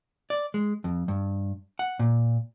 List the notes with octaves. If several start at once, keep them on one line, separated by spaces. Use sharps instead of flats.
D5
G#3
F2
G2
F#5
A#2